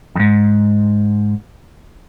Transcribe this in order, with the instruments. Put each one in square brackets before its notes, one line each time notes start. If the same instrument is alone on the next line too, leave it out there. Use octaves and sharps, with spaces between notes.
[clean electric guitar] F2 G#2